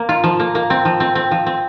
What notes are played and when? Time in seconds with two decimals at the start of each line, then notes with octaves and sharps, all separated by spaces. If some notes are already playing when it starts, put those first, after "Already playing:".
Already playing: A#3
0.09 F4
0.24 F3
0.40 A#3
0.55 A#3
0.70 C4
0.85 F3
1.00 C4
1.15 C4
1.31 F3
1.46 C4